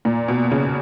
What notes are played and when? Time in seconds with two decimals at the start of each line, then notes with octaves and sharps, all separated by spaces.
0.05 A#2
0.28 B2
0.51 C#3